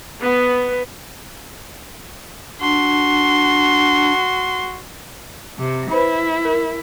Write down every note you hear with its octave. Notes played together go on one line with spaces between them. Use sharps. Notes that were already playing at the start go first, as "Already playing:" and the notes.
B3
D4 F#4 C6
C3
E4 B4 C5 B5
A#4